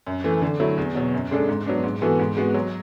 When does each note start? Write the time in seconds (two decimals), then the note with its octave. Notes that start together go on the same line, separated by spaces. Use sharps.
0.07 F#2
0.24 E3 A3
0.41 D3
0.60 F#3 A3 E4
0.78 E2
0.95 B2 F#3
1.13 F#2
1.31 C#3 G#3 D4 A4
1.49 G#2
1.66 F#3 B3 D4
1.84 G#2
2.01 E3 B3 F#4 A4
2.19 G#2
2.37 G#3 B3 F#4
2.54 F#3